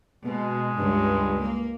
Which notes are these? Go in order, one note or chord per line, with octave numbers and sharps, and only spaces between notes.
B2 G#3
C#2 G2
A#3